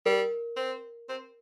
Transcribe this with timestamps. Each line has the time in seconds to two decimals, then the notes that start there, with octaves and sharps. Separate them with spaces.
0.06 G3 A#4
0.56 C4
1.09 C4